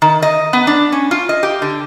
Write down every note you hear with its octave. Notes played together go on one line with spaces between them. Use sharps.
D#3
D#5
B3
D4
C#4
F4
D#5
G4
D3